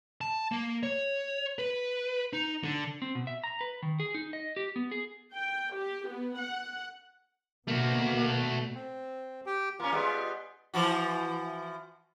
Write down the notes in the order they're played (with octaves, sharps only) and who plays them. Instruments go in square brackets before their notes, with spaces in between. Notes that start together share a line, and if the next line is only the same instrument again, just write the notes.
[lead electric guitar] A5
A#3
C#5
B4
D#4
D3
[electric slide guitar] C4
B2
E5
A#5
B4
D#3
G#4
D#4
D#5
G4
B3
G#4
[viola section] G5
G4
B3
F#5
[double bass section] B2 [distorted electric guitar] A3 F#4 [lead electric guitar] A#3
[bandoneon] C4
G4 G5
[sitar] A#3 C#4 [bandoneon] F4
[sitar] G3 G#3 B3
E3 F3 F#4